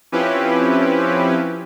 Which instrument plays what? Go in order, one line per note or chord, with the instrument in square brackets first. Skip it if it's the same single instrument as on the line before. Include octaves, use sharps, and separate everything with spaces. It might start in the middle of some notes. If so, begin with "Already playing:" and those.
[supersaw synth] F3 C4 C#4 E4 G4 B4